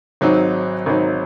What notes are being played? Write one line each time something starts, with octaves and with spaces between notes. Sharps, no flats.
G#1 G#2 F#3 C4 D#4
G#1 G#2 F#3 C4 D#4